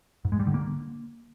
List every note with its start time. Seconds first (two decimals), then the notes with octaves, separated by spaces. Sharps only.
0.25 G#2
0.32 G#3
0.39 G3
0.47 D3
0.54 A#3